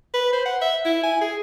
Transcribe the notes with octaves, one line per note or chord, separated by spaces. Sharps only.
B4
C5
F#5
E5
E4
G#5
G#4